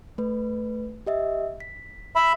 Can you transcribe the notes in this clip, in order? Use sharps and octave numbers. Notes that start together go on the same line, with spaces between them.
A3 B4
G4 D#5 E5
B6
E5 B5